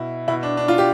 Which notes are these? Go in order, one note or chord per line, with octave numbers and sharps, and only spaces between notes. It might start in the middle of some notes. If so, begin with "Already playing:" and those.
Already playing: B2 E4
B2 E4
D4
D4
F4
G4